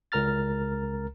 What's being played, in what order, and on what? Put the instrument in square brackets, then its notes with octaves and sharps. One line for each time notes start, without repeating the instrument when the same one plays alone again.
[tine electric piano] C#2 A#4 A#5 F6 A6